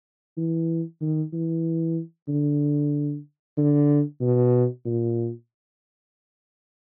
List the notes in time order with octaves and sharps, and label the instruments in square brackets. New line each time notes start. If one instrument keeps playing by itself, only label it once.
[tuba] E3
D#3
E3
D3
D3
B2
A#2